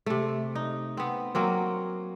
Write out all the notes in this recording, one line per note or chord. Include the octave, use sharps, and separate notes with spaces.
C3 A3
D#4
B3 C4
F#3 A#3 C4